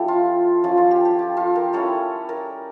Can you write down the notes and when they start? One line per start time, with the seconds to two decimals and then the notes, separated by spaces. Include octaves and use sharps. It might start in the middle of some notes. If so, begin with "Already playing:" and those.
Already playing: F3 C#4 E4 G4 A4
0.08 F4
0.64 F3 C#4 F4
0.77 F4 A4
0.91 G4
1.05 G4
1.19 G4
1.37 F4 A4
1.55 G4 A#4
1.73 G3 C#4 E4 A4 C#5
2.29 A#4 D5